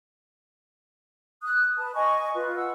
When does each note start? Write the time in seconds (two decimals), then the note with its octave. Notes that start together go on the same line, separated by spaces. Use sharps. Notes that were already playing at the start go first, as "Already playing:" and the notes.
1.42 D#6 F#6
1.77 B4 A5
1.95 D#5 G#5 C#6
2.34 F4 B4
2.56 F#5 E6